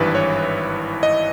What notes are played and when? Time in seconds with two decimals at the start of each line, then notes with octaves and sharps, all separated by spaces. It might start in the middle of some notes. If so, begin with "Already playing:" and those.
Already playing: G#1 G2 E3 B4
0.15 C#5
1.03 D#5